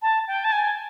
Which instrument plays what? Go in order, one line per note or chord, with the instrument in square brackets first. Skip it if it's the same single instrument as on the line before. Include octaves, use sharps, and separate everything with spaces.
[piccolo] A5
G5
A5
G#5